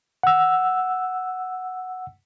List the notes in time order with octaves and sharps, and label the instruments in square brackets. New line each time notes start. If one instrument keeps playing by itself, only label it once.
[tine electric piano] F#5 E6